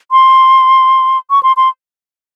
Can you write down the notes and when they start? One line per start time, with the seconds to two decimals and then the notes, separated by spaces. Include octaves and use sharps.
0.11 C6
1.30 C#6
1.43 C6
1.57 C6